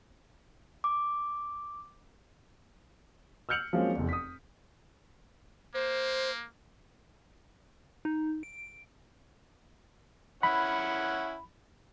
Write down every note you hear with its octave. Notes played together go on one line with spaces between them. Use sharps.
D6
E6 F6 G6 C#7 F7 F#7
F3 F#3 G#3 A#3 C4 C#4
F1 E2
D#6 B6
A#3 C5
D#4
D7
C#4 E4 F#5 B5